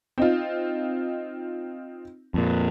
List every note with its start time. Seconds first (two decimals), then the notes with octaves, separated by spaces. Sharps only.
0.18 C4 D#4 F4
2.34 F2 A#2